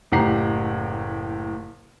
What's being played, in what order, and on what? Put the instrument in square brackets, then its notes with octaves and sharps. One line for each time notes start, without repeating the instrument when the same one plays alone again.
[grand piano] F#1 A2 G4 F#5 A#5 C7